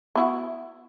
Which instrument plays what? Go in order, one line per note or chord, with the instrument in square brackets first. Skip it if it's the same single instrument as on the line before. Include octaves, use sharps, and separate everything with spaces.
[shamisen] B3 E4 F#4